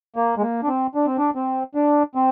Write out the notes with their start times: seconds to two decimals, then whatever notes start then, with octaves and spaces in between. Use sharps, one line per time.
0.16 A#3
0.38 G#3
0.42 A#3
0.63 D4
0.68 C4
0.95 D4
1.06 C4
1.18 D4
1.35 C4
1.75 D4
2.15 C4